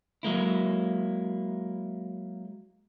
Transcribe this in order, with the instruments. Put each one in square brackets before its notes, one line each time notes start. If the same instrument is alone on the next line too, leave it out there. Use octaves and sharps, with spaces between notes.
[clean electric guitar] F#3 G#3 A#3 E4